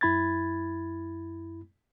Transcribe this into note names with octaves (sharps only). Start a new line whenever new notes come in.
F#2 E4 B5 G#6 A6